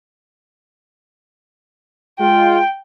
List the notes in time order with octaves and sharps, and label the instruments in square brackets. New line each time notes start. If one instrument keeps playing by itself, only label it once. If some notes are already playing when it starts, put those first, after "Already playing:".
[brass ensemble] G#3 F4 [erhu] G5